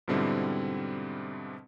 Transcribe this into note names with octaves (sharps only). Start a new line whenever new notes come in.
G#2 B2 D3 G3 C4 E4